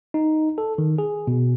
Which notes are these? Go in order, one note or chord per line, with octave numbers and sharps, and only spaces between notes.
D#4
A4
D#3
G#4
B2